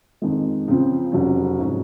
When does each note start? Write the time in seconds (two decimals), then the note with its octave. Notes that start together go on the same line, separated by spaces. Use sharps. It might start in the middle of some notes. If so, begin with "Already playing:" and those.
0.22 F2 D#3 G#3
0.68 C#2 C#3 F3 C4 F4
1.12 F1 F2 C#3 F#3 C#4
1.58 G#2 F#3 C#4 F#4